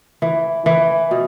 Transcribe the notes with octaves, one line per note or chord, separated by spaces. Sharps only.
E3
E3
B2